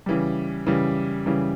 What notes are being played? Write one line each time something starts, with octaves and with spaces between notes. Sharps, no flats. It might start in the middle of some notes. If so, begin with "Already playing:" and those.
C#3 E3 G3
C#3 E3 G3
C#3 E3 G3